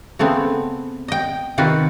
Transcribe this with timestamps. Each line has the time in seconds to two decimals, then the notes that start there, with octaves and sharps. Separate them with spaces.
0.19 C#3 A3 B3 C4
1.08 D#5 G5
1.58 C3 D#3 C4 F4 F#4 B4